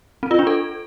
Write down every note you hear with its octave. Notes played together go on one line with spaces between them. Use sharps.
C4
F4
D4
A4